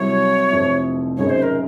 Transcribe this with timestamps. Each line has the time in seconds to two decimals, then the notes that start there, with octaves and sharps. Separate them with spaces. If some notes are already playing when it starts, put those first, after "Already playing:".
Already playing: C2 C3 F#3 C#5
0.50 F1 F2 C3
1.17 G#1 F#2 C#3 G#3 C#5
1.30 C5
1.42 A#4